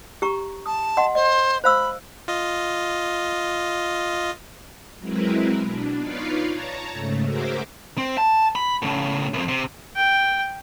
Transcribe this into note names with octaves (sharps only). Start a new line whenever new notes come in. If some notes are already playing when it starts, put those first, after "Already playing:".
G4 A#5 C#6
A5 D#6
D#5 F#5 C6
C5 D#5
C5 F5 B5 E6
F4 D#5
F#3 G#3 C4 E4 A#4 B4
B2 D4
D#4 F4 B4 C#5 D5 F5
C#5 A5 A#5
G#2 C#3 A3
F#4 G#4 A#4 C5 E5 D6
C4
A5
B5
A2 C#3
C2 F2
C3
G5